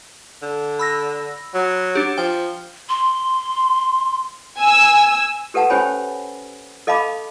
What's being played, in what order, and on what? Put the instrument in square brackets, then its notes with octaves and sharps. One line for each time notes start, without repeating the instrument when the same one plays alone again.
[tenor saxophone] D3
[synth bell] B5 E6 A#6
[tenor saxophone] F#3
[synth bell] D4 G4
[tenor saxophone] F3 [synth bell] G5
[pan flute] C6
[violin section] G#5 E6
[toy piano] G4 A4 B4 F#5 A5
C#4 G4 C5 C#5 G#5 B5
A4 D#5 F5 A5 B5 D6